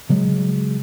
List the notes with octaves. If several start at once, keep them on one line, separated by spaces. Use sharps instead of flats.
C#3 F#3 G#3